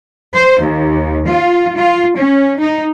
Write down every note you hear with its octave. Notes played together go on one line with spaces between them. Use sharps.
C5
D#2
F4
F4
C#4
D#4